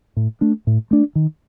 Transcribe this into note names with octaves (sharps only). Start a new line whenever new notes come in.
A2
A3 D4
A2
A3 D4
D#3